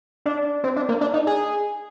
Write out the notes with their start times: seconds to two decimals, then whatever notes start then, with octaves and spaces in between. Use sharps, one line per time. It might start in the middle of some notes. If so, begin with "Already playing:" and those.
0.26 D4
0.64 C4
0.76 D4
0.89 A#3
1.01 D4
1.14 D#4
1.27 G#4